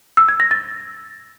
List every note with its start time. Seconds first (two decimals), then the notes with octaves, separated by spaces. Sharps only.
0.17 E6
0.29 G#6
0.40 A#6
0.51 A6